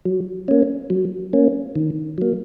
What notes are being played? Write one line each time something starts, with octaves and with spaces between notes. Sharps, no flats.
F#3
A#3 C#4
F#3
A#3 C#4
D#3
F#3 A#3